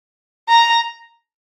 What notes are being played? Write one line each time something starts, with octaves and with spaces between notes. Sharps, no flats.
A#5